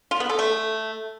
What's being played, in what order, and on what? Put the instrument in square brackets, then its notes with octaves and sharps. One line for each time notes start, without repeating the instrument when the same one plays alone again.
[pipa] F4
B3
A4
A3